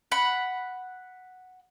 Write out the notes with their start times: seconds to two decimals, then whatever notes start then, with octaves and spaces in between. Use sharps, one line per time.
0.12 F#5 B5